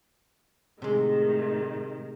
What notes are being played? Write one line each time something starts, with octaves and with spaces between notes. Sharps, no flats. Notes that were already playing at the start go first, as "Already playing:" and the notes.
A2 C3 D#3 G#3